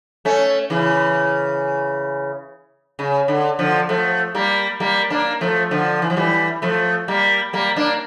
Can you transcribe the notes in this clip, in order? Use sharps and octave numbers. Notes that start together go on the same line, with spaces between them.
A3 C#4
C#3 E3
C#3
D3
D3 F3
F3 A3
G3 A#3
G3 A#3
A#3 D4
F3 A3
D3 F3
E3
F3
E3 G3
F3 A3
G3 A#3
G3 A#3
A#3 D4